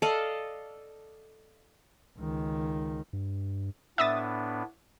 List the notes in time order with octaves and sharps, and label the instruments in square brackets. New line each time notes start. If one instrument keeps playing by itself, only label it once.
[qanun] A4 D5 D#5 F5
[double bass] C#2 D#3
[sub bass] G2
[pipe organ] A2 B3 D4 [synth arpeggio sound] E5 D#6 A6